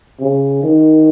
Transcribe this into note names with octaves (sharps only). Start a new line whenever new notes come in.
C#3
D#3